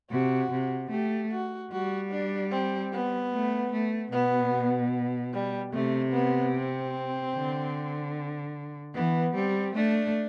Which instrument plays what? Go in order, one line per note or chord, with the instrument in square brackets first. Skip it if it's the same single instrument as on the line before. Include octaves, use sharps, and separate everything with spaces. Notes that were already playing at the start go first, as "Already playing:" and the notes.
[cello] C3 [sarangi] F#4
[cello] C3
[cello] A3 [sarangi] G4
[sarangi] F#4
[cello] G3 [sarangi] F#4
[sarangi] D4
C4
B3
[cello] A3
A3
[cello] B2 [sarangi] B3
[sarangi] G3
[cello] C3 [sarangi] A3
[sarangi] B3
C4
[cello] D3
[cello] E3 [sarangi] B3
[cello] G3 [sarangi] C4
[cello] A3 [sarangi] D4